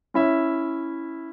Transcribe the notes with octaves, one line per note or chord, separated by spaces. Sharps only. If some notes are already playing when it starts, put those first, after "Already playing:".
C#4 E4 E5